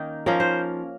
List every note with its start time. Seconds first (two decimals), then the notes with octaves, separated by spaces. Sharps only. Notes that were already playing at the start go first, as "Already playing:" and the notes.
Already playing: D#3 A#3 C#4 D#4
0.26 F3 A#3 C#4 A#4
0.40 C5